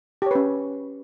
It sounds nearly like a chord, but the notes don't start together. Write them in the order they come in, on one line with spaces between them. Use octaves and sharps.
G4 C#5 B4 C#4